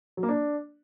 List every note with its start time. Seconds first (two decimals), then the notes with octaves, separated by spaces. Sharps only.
0.17 F#3
0.23 A#3
0.29 D4